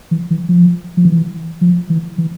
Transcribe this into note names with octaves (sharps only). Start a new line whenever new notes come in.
E3
E3
F3
F3
E3
F3
E3
E3